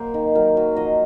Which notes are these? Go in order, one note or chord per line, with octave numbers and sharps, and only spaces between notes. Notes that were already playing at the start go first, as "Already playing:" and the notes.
Already playing: F#3 A#3 C5
D#3
F#3 A#4
F#3
F3 D#5